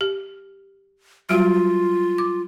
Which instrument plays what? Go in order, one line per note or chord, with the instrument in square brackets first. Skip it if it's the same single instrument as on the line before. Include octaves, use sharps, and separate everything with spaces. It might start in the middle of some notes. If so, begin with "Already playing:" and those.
[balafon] G4
[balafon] F#3 G3 F#4 [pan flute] F4
[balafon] D6